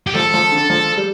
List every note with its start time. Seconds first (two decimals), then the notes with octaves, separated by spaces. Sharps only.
0.07 G4
0.15 F3 A4
0.34 F3
0.52 D3
0.70 F3
0.97 G3